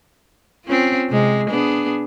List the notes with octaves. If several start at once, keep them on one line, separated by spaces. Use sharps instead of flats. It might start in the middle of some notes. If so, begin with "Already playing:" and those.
C4 C#4 F4
C3 G#3
B3 D4 G#4